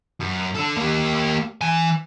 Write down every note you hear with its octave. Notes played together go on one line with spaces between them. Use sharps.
F#2
D4 A4
A#3 G4
E3 G#5